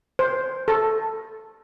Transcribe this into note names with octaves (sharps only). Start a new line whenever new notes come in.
C5
A4